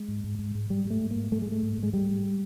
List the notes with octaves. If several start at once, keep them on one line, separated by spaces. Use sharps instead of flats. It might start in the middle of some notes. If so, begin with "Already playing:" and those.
Already playing: G#3
G#2
G#2
G#2
G#2
G#2 G3
G#2
A3
G#2
A#3
G#2
G#2 A3
G#3
G#2
A3
G#2
G#2
G#3
G#2 G3
G#2